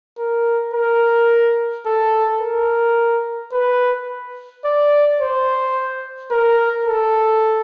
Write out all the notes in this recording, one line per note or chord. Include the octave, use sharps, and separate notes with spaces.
A#4
A#4
A4
A#4
B4
D5
C5
A#4
A4